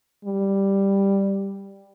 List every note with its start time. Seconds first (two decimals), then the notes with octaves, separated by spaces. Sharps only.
0.25 G3